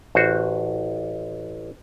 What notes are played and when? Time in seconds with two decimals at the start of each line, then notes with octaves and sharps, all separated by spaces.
0.15 A1 F#4 C5